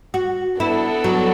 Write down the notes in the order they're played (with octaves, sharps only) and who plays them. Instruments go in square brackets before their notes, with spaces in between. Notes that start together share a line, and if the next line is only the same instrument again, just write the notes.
[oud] F#4
[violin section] B3 D4 A4 [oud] E4
[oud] F#3